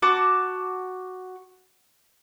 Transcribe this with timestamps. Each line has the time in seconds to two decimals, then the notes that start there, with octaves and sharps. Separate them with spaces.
0.02 F#4 A5 D6